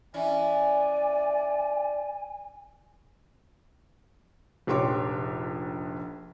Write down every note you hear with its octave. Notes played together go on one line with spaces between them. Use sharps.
E3 C#4 E4 D5 G#5
F1 A#1 G4 C#5 C6 D6